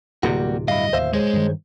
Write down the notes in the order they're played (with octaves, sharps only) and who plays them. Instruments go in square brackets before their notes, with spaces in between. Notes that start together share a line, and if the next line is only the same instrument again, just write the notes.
[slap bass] D1 C3 [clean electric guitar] G3 A#3 F#4
[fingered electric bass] G2 [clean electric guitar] E4 F5 [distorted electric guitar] D#5
[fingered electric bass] D#2 [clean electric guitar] C5 E5 F5
[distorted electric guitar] G#3 [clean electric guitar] G#4 C5 C#5
[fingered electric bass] G2 D#3